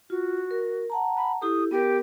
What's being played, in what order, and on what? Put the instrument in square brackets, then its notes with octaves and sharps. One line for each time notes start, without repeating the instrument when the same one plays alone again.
[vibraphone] F4 [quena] F#4
[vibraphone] A#4
F#5 A5 A#5
[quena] B5
[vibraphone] E4 G4 A4 [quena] D#6
[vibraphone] B3 A#4 [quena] G4